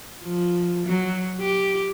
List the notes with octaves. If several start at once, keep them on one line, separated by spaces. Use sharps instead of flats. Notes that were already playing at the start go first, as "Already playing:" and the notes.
F3
F#3
G4